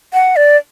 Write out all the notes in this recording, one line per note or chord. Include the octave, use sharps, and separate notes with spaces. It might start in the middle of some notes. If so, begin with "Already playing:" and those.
F#5
D5